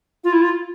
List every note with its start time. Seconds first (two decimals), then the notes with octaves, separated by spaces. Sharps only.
0.24 F4
0.33 E4
0.42 F4